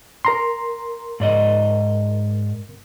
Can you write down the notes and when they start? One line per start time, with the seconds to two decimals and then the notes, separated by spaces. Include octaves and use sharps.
0.25 A#4 A#5 C6
1.20 G#2 D5 D#5